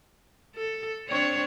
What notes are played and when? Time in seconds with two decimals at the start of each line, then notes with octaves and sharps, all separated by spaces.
0.56 A4
1.08 C4 D4 C#5